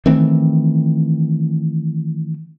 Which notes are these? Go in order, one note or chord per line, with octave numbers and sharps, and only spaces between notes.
D#3 E3 A3 C4